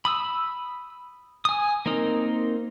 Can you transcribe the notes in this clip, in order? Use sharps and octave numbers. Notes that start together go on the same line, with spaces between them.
B5 D#6 E6
G#5 D#6
A#3 C4 D#4 A#4